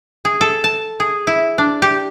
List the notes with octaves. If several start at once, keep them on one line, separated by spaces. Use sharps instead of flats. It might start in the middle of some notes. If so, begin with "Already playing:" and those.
G#4
A4
A5
G#4
E4
D4
G4